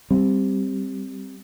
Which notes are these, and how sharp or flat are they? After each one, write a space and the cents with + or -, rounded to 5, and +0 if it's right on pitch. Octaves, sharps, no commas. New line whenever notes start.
G3 +5 C4 +5